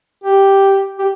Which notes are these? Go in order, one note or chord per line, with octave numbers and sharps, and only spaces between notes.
G4
G4